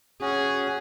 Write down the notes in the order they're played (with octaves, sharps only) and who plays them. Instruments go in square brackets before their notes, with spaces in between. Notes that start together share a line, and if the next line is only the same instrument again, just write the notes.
[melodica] C#4 F#4 [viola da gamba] G#4